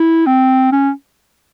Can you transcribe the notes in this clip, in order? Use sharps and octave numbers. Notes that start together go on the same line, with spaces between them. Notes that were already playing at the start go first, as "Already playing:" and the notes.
Already playing: E4
C4
C#4